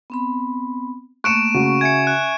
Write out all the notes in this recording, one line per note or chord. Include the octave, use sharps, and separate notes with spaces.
B3 C4 B5
A3 A#3 C#6 F#6 C#7 D7 E7
C#3 F#4
E5 G#5 G#6 C#7
F#6